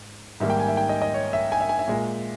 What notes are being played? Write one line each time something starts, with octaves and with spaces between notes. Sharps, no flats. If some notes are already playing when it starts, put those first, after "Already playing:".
Already playing: G#2
G#2 D#3 G3 A#3 E5
G5
G#5
E5
G5
D#5
D#5
C#5
E5
G#5
E5
G#5
E5
A#2 G#3